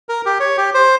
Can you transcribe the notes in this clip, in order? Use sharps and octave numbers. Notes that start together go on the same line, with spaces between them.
A#4
G4
C#5
G4
C5